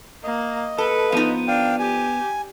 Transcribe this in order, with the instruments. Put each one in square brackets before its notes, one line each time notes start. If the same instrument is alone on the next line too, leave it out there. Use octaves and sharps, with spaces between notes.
[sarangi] A#3 [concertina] D#5
[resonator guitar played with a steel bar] A4 [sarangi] B4
[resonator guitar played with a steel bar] F3 D#4 [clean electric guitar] B3
[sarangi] D4 [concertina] F5 G5
[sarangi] G4 [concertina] G#5